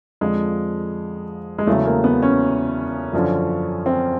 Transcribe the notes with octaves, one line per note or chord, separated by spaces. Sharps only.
F2 D3 F3 G#3
G#3
E2 C#3 F#3 A3
A#3
B3
C#4
F#2 D3 F3
C4